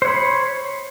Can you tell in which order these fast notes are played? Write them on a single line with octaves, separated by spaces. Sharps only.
C5 C#5 B5